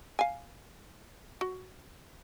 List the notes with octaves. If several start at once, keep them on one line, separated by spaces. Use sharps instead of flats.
F5 G#5
F#4